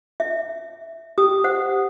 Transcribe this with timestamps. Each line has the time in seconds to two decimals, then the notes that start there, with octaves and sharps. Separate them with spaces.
0.20 E5
1.18 G4 D#6
1.44 C5 F#5